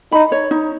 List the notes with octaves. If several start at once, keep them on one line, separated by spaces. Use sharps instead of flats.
D#4 B5
C#5
D#4